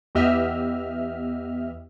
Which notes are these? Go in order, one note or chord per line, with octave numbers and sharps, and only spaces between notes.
E2 B3 G4 D#5 E5 F6